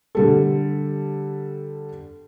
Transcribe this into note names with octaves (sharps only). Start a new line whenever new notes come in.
D3 G3 A4